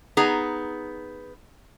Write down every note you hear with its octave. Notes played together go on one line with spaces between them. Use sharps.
B3 D#4 G#4 A#5